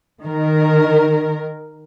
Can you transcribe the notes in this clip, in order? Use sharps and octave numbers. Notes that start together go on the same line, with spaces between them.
D#3 A#4